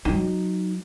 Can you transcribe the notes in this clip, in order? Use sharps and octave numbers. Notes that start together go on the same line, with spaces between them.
F#3 D#4